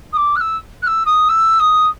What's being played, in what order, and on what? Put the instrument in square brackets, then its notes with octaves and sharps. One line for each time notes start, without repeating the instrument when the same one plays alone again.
[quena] D#6
D6
F#6
E6
F#6
E6
D#6
E6
D#6